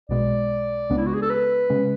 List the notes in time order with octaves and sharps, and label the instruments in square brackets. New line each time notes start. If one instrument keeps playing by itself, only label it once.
[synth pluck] B1 B2 G#3 [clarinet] D5
[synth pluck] C#2 C#3 G#3 B3 D4
[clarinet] E4
F#4
G#4
A4
B4
[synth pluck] C#3 G#3 C#4